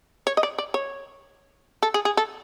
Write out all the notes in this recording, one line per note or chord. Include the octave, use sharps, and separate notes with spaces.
C#5
D#5
D5
D5
C#5
A4
G#4
G#4
A4